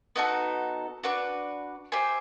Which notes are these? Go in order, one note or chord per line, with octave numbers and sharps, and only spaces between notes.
B3 D#4 F#4 A4
D4 F#4 B4
G4 C5 E5 G#5